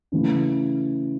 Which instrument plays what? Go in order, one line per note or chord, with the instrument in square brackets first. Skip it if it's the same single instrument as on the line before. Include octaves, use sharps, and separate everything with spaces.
[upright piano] C#3 E3 A3 C#4